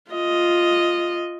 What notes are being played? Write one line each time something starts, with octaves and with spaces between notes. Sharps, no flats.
F4 D#5